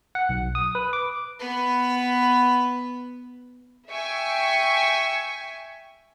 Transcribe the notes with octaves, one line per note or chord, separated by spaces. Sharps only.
F#5
B1
D#6
B4
D6
B3 B4
E5 G5 G#5 C#6